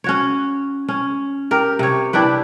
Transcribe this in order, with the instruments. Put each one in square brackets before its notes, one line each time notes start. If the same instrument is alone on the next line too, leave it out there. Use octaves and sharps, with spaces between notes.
[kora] C#4 F#4 C#5
C#4
G4 A#4
C3 C#5
D4 E4 G4 B4